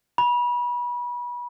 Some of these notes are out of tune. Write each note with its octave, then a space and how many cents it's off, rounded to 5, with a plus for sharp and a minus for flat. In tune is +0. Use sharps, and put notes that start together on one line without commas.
B5 -30